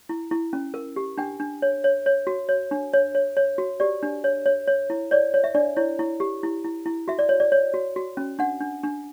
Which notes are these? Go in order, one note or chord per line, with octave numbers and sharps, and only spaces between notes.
E4
E4
C#4
A#4
G4
D4 G5
D4
C#5
C#5
C#5
F#4
C#5
D4
C#5
C#5
C#5
F#4
G4 D5
D4
C#5
C#5
C#5
E4
C#5 D5
C#5
E5
D4 D5
E4 C#5
E4
G4
E4
E4
E4
F#4 E5
D5
C#5
D5
C#5
F#4
F#4
C#4
D4 F#5
D4
D4